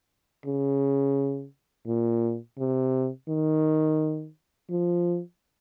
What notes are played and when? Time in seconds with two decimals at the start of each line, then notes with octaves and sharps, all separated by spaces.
0.46 C#3
1.87 A#2
2.59 C3
3.29 D#3
4.70 F3